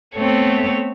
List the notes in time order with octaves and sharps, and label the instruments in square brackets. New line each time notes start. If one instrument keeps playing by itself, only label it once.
[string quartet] A3 B3 C4 A4 C#5